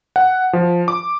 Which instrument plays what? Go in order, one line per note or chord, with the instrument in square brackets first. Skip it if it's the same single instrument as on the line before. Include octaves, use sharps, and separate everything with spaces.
[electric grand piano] F#5
F3
D6